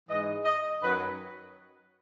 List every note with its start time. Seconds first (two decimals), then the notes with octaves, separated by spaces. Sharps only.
0.08 G#2 E3 G#3 D#5
0.44 D#5
0.81 F#2 D#3 F#3 B4